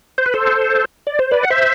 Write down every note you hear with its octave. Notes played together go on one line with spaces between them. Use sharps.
C5
B4
A4 C5
D5
C5
B4 D5
F#5
C5 E5